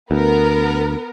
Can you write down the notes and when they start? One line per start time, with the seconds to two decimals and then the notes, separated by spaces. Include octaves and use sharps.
0.11 D2 B3 A#4